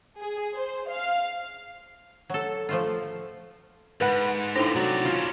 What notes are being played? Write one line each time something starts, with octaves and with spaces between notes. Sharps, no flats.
G#4
C5
F5
F#3 A4
F3 A3 F4
G#2 B4 F#5
A2 D4 D#4 F4 G4 C5
C3 F#3 D5
B2 C#4 F4